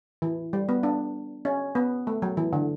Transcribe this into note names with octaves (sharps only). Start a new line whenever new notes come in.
E3
G3
B3
D4
C#4
B3
A3
F#3
E3
D3